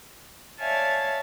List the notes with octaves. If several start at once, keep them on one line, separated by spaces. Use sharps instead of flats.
C#5 D5 E5 F5 G#5 A5